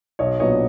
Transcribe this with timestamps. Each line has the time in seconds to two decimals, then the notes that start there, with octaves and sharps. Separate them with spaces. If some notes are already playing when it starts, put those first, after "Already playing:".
0.19 B1 C#5 D#5
0.40 A#2 F#3 B3 D4 C#5 D#5